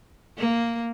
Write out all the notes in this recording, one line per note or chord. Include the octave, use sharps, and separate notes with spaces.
A#3